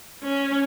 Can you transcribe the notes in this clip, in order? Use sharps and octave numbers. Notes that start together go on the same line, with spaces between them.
C#4